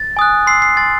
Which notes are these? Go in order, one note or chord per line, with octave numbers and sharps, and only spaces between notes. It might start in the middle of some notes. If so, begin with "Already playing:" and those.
Already playing: A6
G#5 D#6 F#6
C6 E6 C7
C7
G#5 C6 D#6 A6